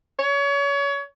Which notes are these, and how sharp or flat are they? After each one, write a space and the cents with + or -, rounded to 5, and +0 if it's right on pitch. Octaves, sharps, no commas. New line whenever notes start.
C#5 +30